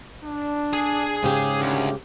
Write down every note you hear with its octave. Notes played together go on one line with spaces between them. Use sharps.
D4
G#4 G#5
G#2 C#3 G4
D2 D#3 G#3 C#4